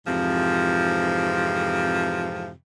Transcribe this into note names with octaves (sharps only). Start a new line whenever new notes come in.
F2 G#2 C3 E3 F3